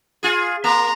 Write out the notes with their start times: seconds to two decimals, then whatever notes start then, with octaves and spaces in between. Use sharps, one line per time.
0.23 F4 G#4
0.64 A#3 A#5 C6